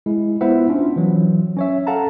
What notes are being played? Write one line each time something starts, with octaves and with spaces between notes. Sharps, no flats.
G#3 E4
B3 E4 F4 C5 E5 F#5
C#4 D4 F4
E3 F#3
C#4 C#5 E5
A4 F5 F#5 A5 A#5